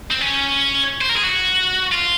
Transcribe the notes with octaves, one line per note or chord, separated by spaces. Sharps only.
C4
C#4
C5
A#4
G#4
F#4
F4